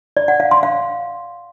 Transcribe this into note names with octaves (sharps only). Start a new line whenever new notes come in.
D5
F#5
F5
C6
F5